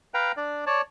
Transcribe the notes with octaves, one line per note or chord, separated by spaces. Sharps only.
B4 F5 G5 A#5
D4 D5
C#5 D5 A5